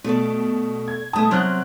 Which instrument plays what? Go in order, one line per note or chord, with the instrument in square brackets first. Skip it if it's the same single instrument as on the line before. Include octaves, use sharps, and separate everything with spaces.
[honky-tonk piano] B2 [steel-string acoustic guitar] A3 D5
[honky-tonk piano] G#6
[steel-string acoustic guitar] B2 A3 [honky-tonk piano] A5 D#6
[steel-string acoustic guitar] C3 F#3 C4 [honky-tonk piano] C6 F6 F#6